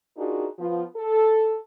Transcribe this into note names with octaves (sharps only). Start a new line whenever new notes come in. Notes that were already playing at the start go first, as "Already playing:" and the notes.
D4 D#4 F4 F#4 G#4 A#4
F3 B3 F4
A4